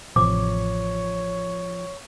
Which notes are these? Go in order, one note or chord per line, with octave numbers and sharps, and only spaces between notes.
A1 C3 F3 C#5 D6